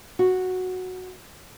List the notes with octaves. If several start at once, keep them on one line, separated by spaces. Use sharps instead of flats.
F#4